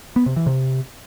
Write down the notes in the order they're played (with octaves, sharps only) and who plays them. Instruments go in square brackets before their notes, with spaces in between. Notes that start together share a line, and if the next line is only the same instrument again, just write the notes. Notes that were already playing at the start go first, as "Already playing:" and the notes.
[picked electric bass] B3
C3
E3
C3